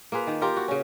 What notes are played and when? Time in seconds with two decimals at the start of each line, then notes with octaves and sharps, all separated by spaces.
0.12 A#3 F4 G#4 B4
0.27 D#3
0.42 F4 G4 A#4
0.56 F#4
0.68 C#3 C#4